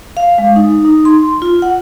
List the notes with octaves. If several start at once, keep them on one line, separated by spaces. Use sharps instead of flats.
F5
G#3
D#4
D#4
C6
F4
F#5